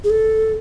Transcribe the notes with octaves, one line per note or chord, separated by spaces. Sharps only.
G#4
A4